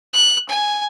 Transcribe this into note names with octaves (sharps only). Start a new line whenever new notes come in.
F#6
G#5